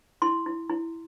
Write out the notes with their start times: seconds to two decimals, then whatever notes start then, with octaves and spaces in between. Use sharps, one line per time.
0.22 E4 C6
0.46 E4
0.70 E4